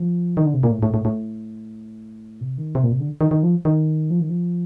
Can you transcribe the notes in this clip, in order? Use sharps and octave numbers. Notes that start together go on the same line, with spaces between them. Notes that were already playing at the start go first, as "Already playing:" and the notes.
Already playing: F3
D#3
D3
C3
A#2
A2
A2
A2
A2
C3
D#3
C3
A#2
C3
D3
D#3
D#3
F3
D#3
F3
D#3
F3